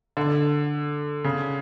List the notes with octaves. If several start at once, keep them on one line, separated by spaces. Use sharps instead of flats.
D3
C#3